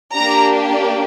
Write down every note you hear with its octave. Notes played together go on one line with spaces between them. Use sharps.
A#3 D4 G4 A#5